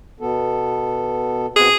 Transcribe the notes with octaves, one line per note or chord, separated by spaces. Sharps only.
B2 B3 A4
B2 B3 C4 G#4